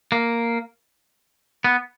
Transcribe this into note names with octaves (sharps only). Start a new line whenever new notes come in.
A#3
B3